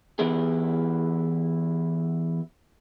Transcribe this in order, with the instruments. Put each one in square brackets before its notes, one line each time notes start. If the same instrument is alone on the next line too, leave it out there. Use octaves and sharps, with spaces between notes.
[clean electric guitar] E3 B3 E4 G4 G#4